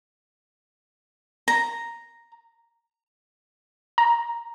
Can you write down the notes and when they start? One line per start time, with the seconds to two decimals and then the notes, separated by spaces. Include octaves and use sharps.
1.48 A#5
3.98 A#5